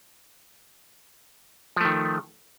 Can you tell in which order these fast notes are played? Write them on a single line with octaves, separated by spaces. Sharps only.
F3 A3 D#3